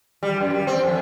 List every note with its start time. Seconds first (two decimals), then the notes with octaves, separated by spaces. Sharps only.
0.23 G3
0.40 F#2
0.54 G3
0.67 C4
0.83 F2